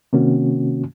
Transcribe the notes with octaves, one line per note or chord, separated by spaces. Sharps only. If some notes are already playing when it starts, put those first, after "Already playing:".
C3 D#3 A#3 C4 C#4 F#4